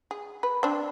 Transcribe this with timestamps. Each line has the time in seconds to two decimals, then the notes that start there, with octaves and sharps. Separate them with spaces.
0.11 G#4
0.43 B4
0.63 C4 D4